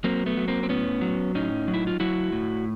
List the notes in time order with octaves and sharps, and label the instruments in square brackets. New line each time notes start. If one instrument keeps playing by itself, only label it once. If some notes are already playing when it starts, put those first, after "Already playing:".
[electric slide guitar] F#3 A#3 C4
A3 B3
F#3
A#3 C4
C4
A2 B3 C#4
F#3
A2 C#4 D#4
F#3
E4
F4
F#3 E4 F#4
A2